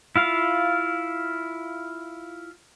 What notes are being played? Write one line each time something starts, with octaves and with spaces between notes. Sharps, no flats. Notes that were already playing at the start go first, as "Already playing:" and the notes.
E4 F4 F5